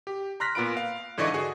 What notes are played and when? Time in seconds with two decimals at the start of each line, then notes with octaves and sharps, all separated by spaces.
0.07 G4
0.40 A#5 C6 F6 F#6 A#6 B6
0.55 A#2 B3 F4 B5 D7
0.77 F5
1.17 G#2 D3 E3 D5 D#5 C#6
1.34 F#4 G#4 C#6